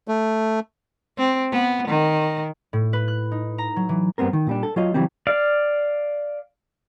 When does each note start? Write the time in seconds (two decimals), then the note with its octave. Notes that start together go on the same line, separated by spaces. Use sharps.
0.08 A3
1.18 C4
1.52 B3
1.88 D#3
2.73 A2
2.93 B4
3.08 F#6
3.32 D#4
3.58 A#5
3.76 F#3
3.89 E3
4.18 G2 G3 B3 C4 A#4
4.33 D#3
4.47 A#2 G3 D4
4.63 A4
4.76 F#3 F4 D#5
4.94 C#3 E3 F#3 G3 C4
5.27 D5 F5